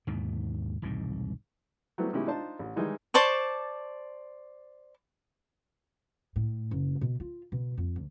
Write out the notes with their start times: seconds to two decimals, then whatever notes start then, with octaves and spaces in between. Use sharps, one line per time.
0.07 D#2 G#2 B2 D3
0.82 E1 C2 G#2 D#3
1.98 F#3 G3 A3 B3 C4
2.13 B2 D#3 G#3 C#4 E4 G4
2.27 D4 D#4 F4 C5 A5
2.59 A1
2.76 D#3 E3 G3 G#3 D#4
3.14 C5 D5 A5 C#6
6.36 A2
6.71 F#1
7.01 B2
7.20 F4
7.52 B2
7.77 F2
7.96 D2